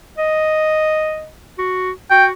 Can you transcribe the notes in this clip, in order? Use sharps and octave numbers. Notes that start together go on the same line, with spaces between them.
D#5
F#4
F#4 G5